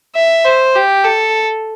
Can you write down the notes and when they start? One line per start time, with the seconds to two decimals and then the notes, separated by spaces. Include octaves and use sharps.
0.15 E5
0.45 C5
0.75 G4
1.04 A4